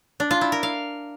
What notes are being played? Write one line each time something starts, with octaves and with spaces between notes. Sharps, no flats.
D4
F4
E4
A#4
F5